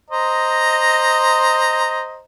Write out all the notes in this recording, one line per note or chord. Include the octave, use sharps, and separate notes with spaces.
C5 D#5 A#5